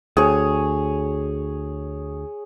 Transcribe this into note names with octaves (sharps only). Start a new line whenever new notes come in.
D2 G#4 C#5